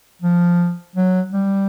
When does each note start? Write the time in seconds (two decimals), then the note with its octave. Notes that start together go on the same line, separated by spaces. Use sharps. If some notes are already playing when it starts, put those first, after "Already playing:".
0.22 F3
0.96 F#3
1.33 G3